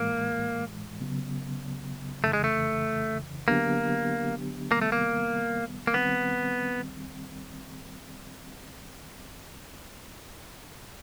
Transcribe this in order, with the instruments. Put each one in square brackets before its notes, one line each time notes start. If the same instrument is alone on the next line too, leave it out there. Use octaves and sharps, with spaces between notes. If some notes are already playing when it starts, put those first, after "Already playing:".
Already playing: [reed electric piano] A2 E3 G#3 [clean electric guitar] A#3
[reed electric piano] C#3 F#3 B3
[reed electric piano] F2 C#3 E3 [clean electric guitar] A3
[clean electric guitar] G#3
A3
[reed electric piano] D3 F#3 B3 D4 G4 [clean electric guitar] A#3
[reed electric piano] C3 D#3 G3 B3 [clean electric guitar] A#3
[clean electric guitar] A3
A#3
A#3
[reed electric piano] D#3 G3 C4 [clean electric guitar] B3